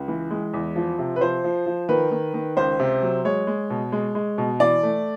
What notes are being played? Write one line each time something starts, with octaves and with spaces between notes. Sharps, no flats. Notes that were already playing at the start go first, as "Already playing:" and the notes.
Already playing: C#2
E3
G#3
E2
F3
C3
B4
F3 C5
F3
F3
D#3 B4
D#3
D#3
C#2 C5
C3
F#3
G#3 C#5
G#3
B2
G#3
G#3
B2
E3 D5
A3